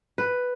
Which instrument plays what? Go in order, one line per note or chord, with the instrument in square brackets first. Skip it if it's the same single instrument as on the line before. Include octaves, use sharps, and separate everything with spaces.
[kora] B4